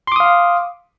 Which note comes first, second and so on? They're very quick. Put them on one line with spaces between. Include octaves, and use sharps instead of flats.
C6 D6 D#6 F5